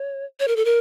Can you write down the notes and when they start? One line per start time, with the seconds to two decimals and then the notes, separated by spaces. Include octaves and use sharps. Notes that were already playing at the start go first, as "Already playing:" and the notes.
Already playing: C#5
0.40 C#5
0.48 A#4
0.56 A4
0.65 A#4